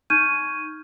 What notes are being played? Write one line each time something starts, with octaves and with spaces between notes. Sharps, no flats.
D#4 C#6 F6 G6 G#6 D#7